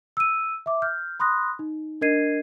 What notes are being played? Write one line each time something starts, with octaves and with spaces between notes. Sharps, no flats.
E6 D#7
E5 D6
F6 G6
B5 C6 D#6 F#6 A#6
D#4
D4 A#4 D#5 G#6 C7 D#7